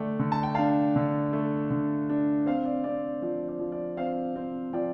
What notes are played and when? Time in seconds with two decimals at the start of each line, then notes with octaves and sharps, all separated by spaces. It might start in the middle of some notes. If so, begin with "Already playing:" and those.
Already playing: D3 A3 D5 G5
0.19 D3
0.32 A5
0.43 G5
0.55 D4 F5 A5
0.96 D3
1.33 A3
1.71 D3
2.09 D4
2.46 C4 C5 F5
2.65 D5
2.84 C4 D5
3.22 F3 D5
3.48 D5
3.60 F3
3.72 D5
3.97 C4 C5 F5
4.36 C4
4.73 F3 D5 G5